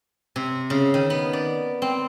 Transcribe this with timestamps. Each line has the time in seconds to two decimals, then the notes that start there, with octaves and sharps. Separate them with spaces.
0.36 C3
0.70 C#3
0.94 D#3
1.10 B3
1.33 D5
1.82 C4